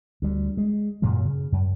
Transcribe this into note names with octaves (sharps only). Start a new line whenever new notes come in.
D2 G3
G#3
F#2 A#2 C#3 F#3
C#3
F#2